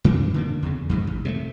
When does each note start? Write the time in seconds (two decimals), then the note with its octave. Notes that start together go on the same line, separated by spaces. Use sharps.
0.04 F#2 E3 C4 D4
0.34 D3 D#3 A#3
0.63 E2 C#3
0.89 F2 G#2 C3
1.07 A1
1.25 C3 G3 A3